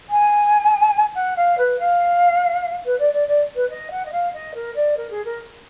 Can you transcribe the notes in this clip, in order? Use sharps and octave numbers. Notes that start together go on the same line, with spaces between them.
G#5
F#5
F5
B4
F5
B4
D5
D5
D5
B4
D#5
F#5
D#5
F5
D#5
A#4
D5
A#4
G#4
A#4